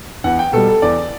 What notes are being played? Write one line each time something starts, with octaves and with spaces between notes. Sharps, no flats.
E2 F#5
G5
B2 G3 A4
A4
E2 D5